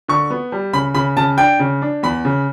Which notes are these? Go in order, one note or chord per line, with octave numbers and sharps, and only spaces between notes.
D3 C#6
B3
G3
C#3 B5
C#3 B5
C#3 A5
D4 G5
C#3
D4
E2 B5
C#3